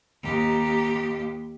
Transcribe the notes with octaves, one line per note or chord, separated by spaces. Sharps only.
D#2 G4